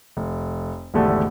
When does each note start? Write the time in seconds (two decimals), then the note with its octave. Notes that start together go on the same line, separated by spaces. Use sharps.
0.17 F1
0.94 G#1 E2 D3 A3 G4